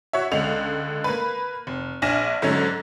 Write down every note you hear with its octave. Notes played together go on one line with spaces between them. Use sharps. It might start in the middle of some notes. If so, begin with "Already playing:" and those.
F#4 C#5 E5
C#2 D3 G#3 F7
A#3 B4
F1
A#1 D4 G#5 F6 A#6 E7
G#2 D3 F#3 C#4